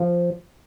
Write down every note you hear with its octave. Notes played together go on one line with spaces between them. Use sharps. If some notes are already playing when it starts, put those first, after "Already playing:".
Already playing: F3